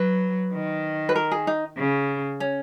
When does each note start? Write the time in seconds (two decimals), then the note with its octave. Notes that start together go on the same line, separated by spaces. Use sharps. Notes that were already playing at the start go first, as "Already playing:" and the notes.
Already playing: F#3 B4
0.53 D#3
1.09 B4
1.16 A#4
1.31 G#4
1.47 D#4
1.77 C#3
2.40 C#4